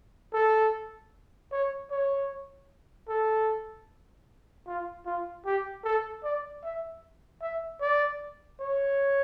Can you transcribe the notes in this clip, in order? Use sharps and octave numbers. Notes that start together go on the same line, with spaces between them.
A4
C#5
C#5
A4
F4
F4
G4
A4
D5
E5
E5
D5
C#5